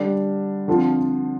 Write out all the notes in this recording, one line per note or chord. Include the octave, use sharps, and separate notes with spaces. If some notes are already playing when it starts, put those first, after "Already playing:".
Already playing: D3 G3 D4
D3 F3 C4 F4